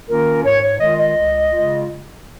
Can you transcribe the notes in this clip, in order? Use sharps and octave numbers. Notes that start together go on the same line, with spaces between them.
D#3 A#3 C#4 F4 A#4
G#2 C#5
C#5
D#3 G#3 F4 D#5
D#5
C#2
C#3 G#3 F4